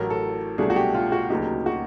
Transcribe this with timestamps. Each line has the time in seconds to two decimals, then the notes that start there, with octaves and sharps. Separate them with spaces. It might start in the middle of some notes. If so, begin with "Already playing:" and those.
Already playing: A1 A2 F#3 A#4
0.10 A4
0.58 C2 B2 F#3 A3 D4 G#4
0.70 F#4
0.76 G4
0.94 F4
1.12 F#4
1.30 D2 C#3 F#3 A#3 D#4 G4
1.66 F#4